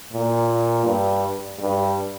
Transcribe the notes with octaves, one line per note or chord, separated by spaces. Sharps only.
A#2
G2
G2